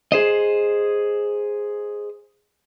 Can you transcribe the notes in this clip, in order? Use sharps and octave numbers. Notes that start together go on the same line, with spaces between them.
G#4 C5 D#5